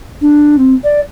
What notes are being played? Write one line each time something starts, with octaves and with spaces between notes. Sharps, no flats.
D4
C4
D5